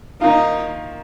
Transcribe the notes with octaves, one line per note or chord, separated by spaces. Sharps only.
D#3 A#3 D#4 F4